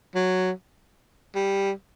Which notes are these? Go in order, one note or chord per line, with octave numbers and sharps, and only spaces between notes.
F#3
G3